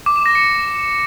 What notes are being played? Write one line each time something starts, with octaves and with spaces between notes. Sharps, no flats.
D6
E7
A#6
C#7